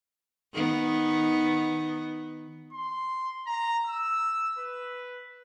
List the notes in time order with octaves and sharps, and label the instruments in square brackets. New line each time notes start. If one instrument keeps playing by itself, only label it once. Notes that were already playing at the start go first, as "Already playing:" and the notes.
[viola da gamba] D#3 B3
[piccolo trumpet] C6
A#5
E6
B4